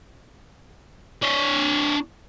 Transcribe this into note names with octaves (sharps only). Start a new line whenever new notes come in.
D4 C#5